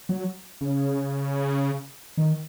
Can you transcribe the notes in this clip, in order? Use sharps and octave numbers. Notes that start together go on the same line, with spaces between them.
F#3
C#3
D#3